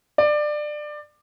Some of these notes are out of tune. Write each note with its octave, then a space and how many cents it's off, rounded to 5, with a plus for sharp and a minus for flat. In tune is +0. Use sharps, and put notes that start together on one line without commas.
D5 +20